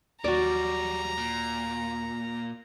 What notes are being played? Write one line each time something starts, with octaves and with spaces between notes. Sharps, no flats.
D#2 F#3 G3 F#4 D5 A#5
A#2